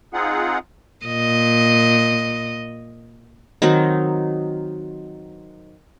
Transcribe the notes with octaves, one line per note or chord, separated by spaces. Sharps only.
C4 D#4 F4 G#4 F#5
A#2 D#5
D#3 F#3 C4 D#4